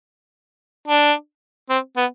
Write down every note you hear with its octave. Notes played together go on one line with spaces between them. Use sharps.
D4
C4
B3